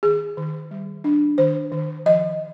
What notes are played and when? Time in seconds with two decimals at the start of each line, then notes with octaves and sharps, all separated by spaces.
0.03 D#3 G#4
0.37 D#3
0.71 G3
1.04 D4
1.38 D#3 C5
1.72 D#3
2.06 F3 D#5